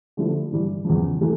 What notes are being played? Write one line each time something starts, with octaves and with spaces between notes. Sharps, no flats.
D3 F3 A3 E4
G2 E3 G3
E2 C#3 F3
E3 A3